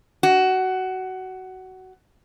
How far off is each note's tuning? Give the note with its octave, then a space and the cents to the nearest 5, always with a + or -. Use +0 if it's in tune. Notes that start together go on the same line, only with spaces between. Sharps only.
F#4 +15